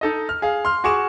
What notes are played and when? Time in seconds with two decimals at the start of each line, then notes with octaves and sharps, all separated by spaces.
0.01 D#4 A4 D#5
0.29 F6
0.42 G#4 F5
0.65 C6 F6
0.84 F#4 G#4 C#6 D6 E7